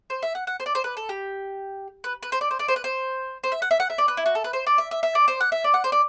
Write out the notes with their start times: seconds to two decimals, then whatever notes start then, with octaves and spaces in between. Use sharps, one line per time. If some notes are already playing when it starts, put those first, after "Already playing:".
0.10 C5
0.23 E5
0.35 F#5
0.47 F#5
0.60 C5
0.66 D5
0.75 C5
0.84 B4
0.97 A4
1.09 G4
2.04 B4
2.23 B4
2.32 C5
2.41 D5
2.51 C5
2.59 D5
2.68 C5
2.76 B4
2.84 C5
3.44 C5
3.52 E5
3.62 F#5
3.71 E5
3.80 F#5
3.90 E5
3.98 D5
4.08 B4
4.17 E4
4.26 F#4
4.35 A4
4.44 B4
4.53 C5
4.67 D5
4.78 E5
4.91 E5
5.03 E5
5.15 D5
5.28 C5
5.41 F#5
5.52 E5
5.64 D5
5.74 F#5
5.84 C5
5.92 D5